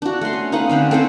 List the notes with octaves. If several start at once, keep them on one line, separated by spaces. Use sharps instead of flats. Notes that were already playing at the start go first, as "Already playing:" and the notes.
D4 F#4
A3 C6
C#4
D#4 B4 F5 F#5
D3 C4 C#4 B5
C4 A4 B4 C5